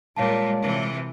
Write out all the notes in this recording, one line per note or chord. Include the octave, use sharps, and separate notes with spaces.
A#2 G3 G#3 C#5 F5 A5
C3 E3